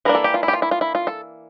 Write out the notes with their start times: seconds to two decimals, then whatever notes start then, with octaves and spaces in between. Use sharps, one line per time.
0.05 E3 A#3 D4 A#4
0.15 A4
0.24 G4
0.34 F4
0.43 E4
0.48 G4
0.53 F4
0.62 E4
0.71 F4
0.81 E4
0.95 F4
1.07 A4